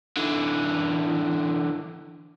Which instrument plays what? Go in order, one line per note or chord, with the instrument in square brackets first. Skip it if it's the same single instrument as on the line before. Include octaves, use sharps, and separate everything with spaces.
[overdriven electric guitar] D3 E3